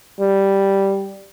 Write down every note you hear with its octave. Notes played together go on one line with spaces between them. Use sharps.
G3